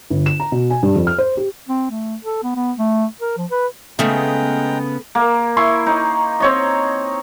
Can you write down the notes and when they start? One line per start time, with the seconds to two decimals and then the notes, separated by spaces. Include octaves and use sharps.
0.10 G1
0.26 E7
0.40 A#5
0.52 B2
0.70 G#5
0.83 G2
0.95 F2
1.07 F6
1.18 C5
1.37 G4
1.69 C4
1.91 A3
2.24 A4
2.43 B3
2.56 B3
2.78 A3
3.21 A#4
3.38 F3
3.51 B4
3.99 C#3 G#3 A3 B3 G#4 G5 A#5
5.15 A#3
5.57 E4 C6 C#6
5.86 D#4
6.40 C4 C#5 D#5